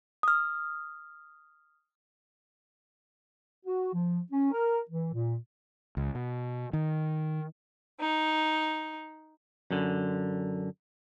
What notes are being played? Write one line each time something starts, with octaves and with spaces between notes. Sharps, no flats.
D#6 F6
F#4
F3
C#4
A#4
E3
A#2
C#2
B2
D#3
D#4
F#2 D3